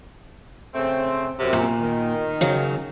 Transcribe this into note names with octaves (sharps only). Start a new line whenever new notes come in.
C#3 A3 C4
F#2 C3
A#2
D#3
C#3 F#3